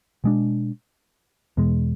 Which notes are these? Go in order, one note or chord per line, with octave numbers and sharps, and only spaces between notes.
B2 G#3 D4
E2 B2 G#3